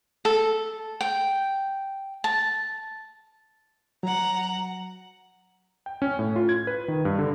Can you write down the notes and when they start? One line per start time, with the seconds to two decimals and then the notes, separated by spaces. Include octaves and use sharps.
0.25 A4
1.01 G5
2.24 A5
4.03 F#3 F#5 A#5
5.86 G5
6.02 C#4
6.19 A2
6.36 F4
6.49 G#6
6.67 B4
6.88 D#3
7.05 G2
7.19 D3